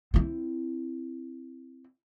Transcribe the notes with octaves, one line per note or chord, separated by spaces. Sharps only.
C4 E4